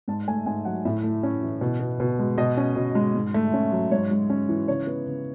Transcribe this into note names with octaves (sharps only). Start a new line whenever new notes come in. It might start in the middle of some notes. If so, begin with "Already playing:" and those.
G#2 A5
A3 G#5
G#2 G#5
F#3 F#5
A2 E5
A3
C#4
E3
B2
B3
B2
G#3
B2 D#5
C#4
B2
G#3
G#2
A3
C#4
F#3
G#2 C#5
G#3
C#4
E3
C#3 C#5
B3
C#3